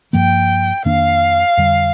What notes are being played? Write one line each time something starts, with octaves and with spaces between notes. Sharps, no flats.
G2 F3 A#3 G5
F2 D#3 A#3 D4 F5
F2 D3 G3